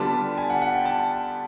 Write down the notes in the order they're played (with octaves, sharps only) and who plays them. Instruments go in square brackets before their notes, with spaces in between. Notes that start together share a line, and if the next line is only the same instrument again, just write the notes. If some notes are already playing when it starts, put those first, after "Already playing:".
Already playing: [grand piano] D3 G3 B3 D4 F4 A5
G#5
F#5
F#5
G5
A5